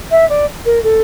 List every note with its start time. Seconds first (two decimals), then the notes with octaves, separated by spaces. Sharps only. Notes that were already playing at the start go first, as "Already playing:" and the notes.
0.11 E5
0.29 D5
0.65 A#4
0.83 A4